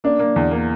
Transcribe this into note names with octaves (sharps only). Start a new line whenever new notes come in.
A#3 D4
A#3
E2
A#3